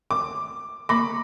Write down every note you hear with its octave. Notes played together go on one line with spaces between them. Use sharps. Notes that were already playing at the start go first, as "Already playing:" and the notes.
D6
A#3 B5 C#6 D6 A#6